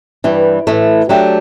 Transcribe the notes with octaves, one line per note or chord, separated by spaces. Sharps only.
G2 E3 G3
A2 E3 A3
F#3 A3 D4 G4